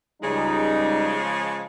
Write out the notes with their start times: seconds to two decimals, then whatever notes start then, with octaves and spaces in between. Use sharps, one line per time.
0.22 C#2 C#3 F3 G3 G#3 D#4